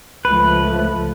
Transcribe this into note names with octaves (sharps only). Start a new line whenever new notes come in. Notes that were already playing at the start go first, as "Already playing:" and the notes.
C#2 F3 A3 B4